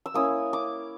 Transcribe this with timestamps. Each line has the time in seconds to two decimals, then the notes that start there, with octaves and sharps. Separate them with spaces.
0.06 E6
0.14 A#3 C#4 E4 D#6
0.53 D6